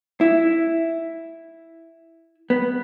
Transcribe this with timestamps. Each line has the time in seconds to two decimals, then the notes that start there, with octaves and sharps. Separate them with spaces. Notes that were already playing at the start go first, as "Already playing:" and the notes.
0.21 E4
2.50 B3